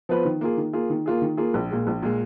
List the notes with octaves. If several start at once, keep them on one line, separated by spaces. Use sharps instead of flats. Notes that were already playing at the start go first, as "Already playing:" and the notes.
F3 B3 F4 B4
D#3
A#3 F4 G#4
D#3
A#3 F4 G#4
D#3
A#3 F4 G#4
D#3
A#3 F4 G#4
A#1
A#2 G#3
A#1
A#2 G#3